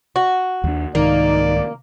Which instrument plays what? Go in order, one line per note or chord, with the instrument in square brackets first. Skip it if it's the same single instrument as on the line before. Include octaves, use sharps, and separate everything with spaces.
[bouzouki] F#4
[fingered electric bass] D#2 G3 D4
[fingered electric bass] C2 G#2 D#3 [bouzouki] A#3 [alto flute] D#4 [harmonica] D5